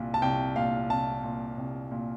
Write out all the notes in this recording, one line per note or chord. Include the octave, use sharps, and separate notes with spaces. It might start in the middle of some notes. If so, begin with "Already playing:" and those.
Already playing: C2 A#2
A5
C2 G5
A#2 F5
C2 A5
A#2
C2
A#2